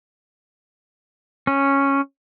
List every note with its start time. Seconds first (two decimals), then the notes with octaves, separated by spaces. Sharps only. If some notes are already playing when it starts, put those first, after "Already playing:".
1.47 C#4